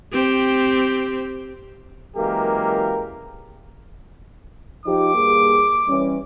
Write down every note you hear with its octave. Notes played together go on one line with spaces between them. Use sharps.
C4 G4
F#2 E3 G#3 A#3 G4 A#4
F3 D#4 G4 D6
G2 A#3 G#4
E3 G3 C#4